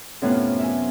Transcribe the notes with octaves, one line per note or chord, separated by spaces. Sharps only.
F#2 A2 C3 F#3 B3 F4
E5 G#5